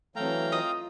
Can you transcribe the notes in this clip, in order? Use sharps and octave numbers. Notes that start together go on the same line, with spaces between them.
E3 F#3 A3 C4 F5 G5 A#5
F4 D#5 D#6